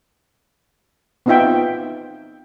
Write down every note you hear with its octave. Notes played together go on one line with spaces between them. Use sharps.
B3 C4 D#4 F4 E5 G5